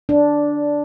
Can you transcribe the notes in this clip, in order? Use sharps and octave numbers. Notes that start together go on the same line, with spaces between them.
D4